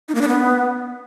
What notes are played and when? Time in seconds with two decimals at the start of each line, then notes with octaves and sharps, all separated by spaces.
0.08 D#4
0.15 A#3
0.21 D4
0.28 B3